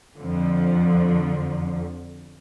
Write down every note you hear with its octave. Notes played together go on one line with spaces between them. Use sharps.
F2 D3 F3